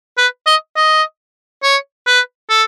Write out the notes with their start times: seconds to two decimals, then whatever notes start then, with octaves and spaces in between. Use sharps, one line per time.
0.18 B4
0.46 D#5
0.76 D#5
1.63 C#5
2.07 B4
2.50 A4